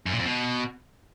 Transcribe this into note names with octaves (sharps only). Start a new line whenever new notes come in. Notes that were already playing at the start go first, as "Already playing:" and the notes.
F#2
A#2
F2
B2